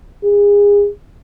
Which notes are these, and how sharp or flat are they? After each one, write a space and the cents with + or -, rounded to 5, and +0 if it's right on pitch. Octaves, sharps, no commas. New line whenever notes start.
G#4 -30